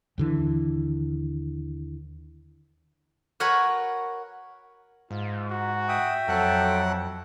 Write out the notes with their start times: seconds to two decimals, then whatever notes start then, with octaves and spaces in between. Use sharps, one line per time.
0.18 D#2 D3 E3
3.40 F#4 A#4 B4 C#5 F#5 G#5
5.11 G#2 F4
5.50 F#4
5.88 E5 G5 D#6
6.28 F2 F#3 A4 F#5